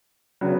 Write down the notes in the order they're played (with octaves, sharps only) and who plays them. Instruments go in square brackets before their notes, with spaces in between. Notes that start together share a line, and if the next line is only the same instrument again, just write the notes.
[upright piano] C#3 F#3 B3